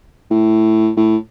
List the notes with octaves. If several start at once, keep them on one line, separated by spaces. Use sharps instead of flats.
A2
A2